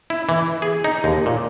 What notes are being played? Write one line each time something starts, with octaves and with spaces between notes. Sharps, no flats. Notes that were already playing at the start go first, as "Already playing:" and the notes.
E4
E3
G#4
D#4
D#2
A#2